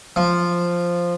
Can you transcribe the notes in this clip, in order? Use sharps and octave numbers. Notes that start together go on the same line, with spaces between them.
F3